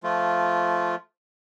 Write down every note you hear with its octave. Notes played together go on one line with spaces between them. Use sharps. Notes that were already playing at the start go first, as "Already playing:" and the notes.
F3 A3 F4